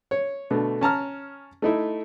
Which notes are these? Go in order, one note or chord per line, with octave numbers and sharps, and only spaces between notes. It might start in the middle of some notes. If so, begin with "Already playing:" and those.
C#5
B2 D3 A3
C#4 A5 A#5 F6
A3 D#4 E4